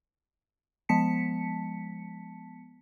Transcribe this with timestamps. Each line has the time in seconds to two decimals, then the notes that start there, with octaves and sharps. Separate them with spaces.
0.89 F3 G#3 B3 A5 B6 C#7